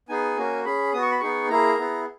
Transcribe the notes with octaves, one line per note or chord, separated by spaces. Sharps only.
B3 D#4 G#4 G#5
A#3 C#4 F#4
C#4 G#4 B5
B3 F#4 C#6 D#6
B5
B3 D#4 G#4 C#6
A#3 E4 G#4 A#5
B3 E4 G#4